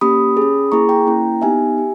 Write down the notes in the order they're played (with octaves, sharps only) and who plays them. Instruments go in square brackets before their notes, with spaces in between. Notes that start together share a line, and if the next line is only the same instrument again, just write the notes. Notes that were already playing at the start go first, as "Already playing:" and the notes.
[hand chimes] A#3 C#4 G4 B5 D#6
C#4 G#4
A#3 E4 G#4 A#5 C#6
G5 A#5
A#3 C#4 E4
B3 D#4 G4 E5 G#5
G4